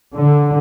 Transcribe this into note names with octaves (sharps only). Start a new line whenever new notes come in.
D3